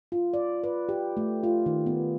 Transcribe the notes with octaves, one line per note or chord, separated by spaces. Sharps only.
F4
D5
B4
G4
A3
F4
D#3
B3